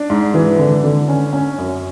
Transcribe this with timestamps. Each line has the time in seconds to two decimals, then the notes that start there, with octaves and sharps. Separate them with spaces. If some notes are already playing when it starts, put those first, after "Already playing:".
Already playing: D4
0.10 G#2
0.34 E3
0.59 D3
0.84 D3
1.08 C#4
1.33 C#4
1.58 F#2